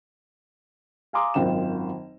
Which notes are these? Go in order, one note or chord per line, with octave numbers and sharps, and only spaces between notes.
F5 G#5 A#5 C6 D6 D#6
G#1 F#2 F4 G5 E7